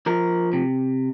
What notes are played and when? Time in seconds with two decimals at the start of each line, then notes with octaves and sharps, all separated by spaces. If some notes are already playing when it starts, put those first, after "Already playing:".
0.06 F3 A#4
0.53 C3